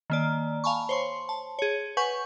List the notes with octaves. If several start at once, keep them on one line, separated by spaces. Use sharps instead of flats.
D#3 A#3 D5
F5 G#5 A5 B5 C#6
C5 C#5 C6
A5
G#4 C#5
B4 F#5 G#5 C#6 G6